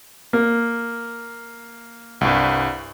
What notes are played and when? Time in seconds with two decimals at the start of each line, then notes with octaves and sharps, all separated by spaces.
0.33 A#3
2.21 C2 G2